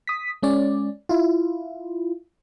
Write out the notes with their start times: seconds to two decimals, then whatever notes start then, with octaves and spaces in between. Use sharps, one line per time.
0.07 D#6 B6
0.43 G#3 C#4 D5
1.09 E4 F4